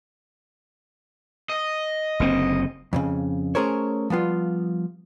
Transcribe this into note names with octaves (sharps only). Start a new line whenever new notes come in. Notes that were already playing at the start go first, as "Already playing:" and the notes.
D#5
F#1 D3 C4
F2 A#2 C#3
A3 C#4 G#4 A#4 C5 C#5
F3 G3 B3 F4